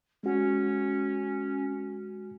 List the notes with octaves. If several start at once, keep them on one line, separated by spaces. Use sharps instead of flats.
G#3 C#4 F#4